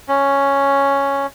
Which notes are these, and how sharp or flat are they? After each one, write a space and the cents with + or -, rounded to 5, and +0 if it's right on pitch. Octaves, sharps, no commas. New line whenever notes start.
C#4 +0